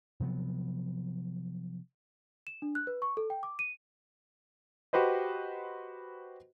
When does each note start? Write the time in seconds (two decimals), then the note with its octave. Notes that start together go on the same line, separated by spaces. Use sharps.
0.20 C3 F3 F#3 B3
2.47 E7
2.62 D4
2.75 F#6
2.87 B4
3.02 C#6
3.17 A4
3.30 G5
3.43 D6
3.59 D#7
4.93 F#4 G4 B4 C5 D#5